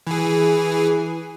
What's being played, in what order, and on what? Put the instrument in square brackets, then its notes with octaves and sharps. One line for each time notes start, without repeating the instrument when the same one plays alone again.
[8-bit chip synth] E3 G#4